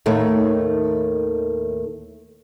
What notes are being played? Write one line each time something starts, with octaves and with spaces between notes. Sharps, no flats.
D#2 A2 D#3 A3